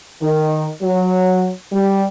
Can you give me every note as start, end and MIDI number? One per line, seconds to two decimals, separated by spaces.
0.22 0.66 51
0.82 1.49 54
1.72 2.04 55